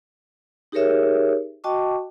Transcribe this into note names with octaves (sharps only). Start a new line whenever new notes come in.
D#4 G4 G#4 A#4 C#5 E5
F#4 D#5 G5 A5 C#6 D6